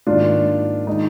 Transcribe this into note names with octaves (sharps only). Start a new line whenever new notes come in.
G#2 D#3 A#3 D4 F4
D#3 G#3 D#4